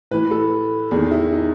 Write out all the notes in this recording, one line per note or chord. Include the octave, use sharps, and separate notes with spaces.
A2 E3 B4
A4
E2 D#3 G#4
E4
D#4